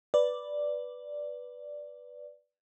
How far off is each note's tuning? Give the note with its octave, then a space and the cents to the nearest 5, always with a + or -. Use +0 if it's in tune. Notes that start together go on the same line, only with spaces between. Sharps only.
B4 +0 D5 +0